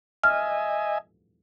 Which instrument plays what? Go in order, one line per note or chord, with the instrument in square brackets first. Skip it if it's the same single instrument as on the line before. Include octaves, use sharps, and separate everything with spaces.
[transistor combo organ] D#5 E5 G#5 [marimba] F6